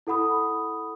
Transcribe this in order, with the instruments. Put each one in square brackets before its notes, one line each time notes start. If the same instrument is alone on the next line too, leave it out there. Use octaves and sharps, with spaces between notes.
[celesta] E4 A4 F#5 B5 D#6